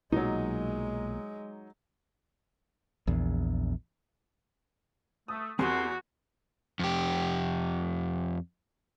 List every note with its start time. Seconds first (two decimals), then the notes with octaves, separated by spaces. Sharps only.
0.12 B1 A#2 F#3 G#3 D#4
3.07 A#1 E2
5.28 A3 D#6
5.59 E2 C4 F#4 G4 A#4 F#5 G#5 C6
6.79 F2 G4